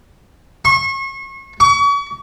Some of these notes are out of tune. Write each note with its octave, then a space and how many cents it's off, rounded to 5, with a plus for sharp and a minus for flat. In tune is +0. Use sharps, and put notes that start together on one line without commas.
C#6 -35
C#6 +40